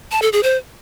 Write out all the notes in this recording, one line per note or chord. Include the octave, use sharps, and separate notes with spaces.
A5
A4
G#4
C5